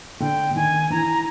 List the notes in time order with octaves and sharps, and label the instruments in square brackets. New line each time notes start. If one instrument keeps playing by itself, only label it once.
[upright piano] D3 [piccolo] G5
[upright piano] D3
[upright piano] D#3 [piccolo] G#5
[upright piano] E3 [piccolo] A#5